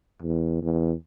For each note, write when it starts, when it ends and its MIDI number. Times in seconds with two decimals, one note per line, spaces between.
0.22 0.61 40
0.63 0.93 40